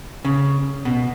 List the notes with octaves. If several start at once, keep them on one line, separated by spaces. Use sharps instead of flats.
C#3
B2